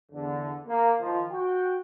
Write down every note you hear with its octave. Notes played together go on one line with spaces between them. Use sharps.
E2 D3
A#3
D#3 F3
F#4 G5